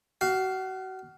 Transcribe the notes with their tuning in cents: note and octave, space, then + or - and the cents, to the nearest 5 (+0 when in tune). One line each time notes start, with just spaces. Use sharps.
F#4 +30 F5 +0